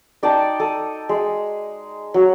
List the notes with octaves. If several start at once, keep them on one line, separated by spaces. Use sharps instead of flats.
D#4 D5 G5 A5
A4 A#5 D#6
G#3
F#3